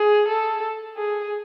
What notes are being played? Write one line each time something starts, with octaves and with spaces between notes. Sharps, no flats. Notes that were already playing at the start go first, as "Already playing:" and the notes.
Already playing: G#4
A4
G#4